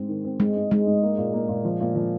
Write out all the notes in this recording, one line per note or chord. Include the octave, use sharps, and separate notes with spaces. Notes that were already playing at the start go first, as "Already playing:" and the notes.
Already playing: G#2 C4
D#3
C4
G#2 G#3
G#2
G#3 D#4
G#2
A#3
A#2
A#3
A#2
F3
A#2
F3